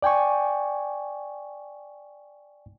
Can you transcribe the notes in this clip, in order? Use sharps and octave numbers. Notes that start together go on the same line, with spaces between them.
D5 G5 G#5 C#6